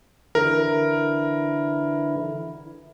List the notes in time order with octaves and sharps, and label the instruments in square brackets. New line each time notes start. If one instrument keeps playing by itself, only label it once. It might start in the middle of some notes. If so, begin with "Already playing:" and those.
[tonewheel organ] D3 E3 E4 [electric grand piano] A#4